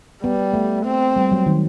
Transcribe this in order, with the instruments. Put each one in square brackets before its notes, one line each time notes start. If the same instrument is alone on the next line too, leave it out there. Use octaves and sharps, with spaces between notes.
[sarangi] G3 [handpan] B3
[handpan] A3
[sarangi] C4
[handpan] G3
F#3
D#3